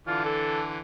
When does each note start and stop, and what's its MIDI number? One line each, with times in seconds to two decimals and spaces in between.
0.07 0.79 50
0.07 0.79 52
0.07 0.79 62
0.07 0.24 65
0.25 0.62 69